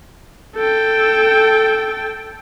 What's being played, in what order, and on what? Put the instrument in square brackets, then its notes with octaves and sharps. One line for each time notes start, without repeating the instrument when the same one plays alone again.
[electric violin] A4 G5